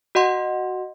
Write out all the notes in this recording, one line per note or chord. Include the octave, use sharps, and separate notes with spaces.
F#4 D#5 F#5 C6